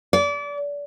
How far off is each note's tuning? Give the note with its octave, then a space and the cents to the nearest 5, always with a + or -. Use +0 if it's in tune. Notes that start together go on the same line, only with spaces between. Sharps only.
D5 -30